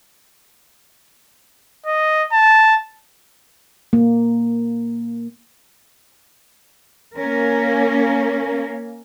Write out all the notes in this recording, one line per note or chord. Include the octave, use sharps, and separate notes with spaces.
D#5
A5
A#3
A#3 C#4 A#4